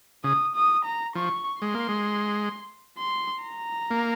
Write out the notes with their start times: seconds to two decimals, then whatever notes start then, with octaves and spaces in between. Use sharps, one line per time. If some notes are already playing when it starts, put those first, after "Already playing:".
0.24 C#3 D#6
0.56 D#6
0.85 A#5
1.15 F3 C#6
1.62 G#3 C6
1.74 A#3
1.88 G#3
2.98 C6
3.44 A#5
3.91 A#3